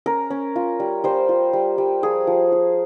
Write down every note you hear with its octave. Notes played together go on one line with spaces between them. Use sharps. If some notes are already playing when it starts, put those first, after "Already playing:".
C#4 A#4
C#4
F4
G3
G3 C5
F4
G3
G3
F3 G#4
F3
F4